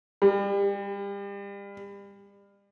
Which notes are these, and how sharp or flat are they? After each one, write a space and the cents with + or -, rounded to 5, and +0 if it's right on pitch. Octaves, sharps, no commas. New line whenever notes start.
G3 +35